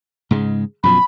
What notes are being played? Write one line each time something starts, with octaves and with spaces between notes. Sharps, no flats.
G#2 C#3 G#3
F#2 B2 F3 B5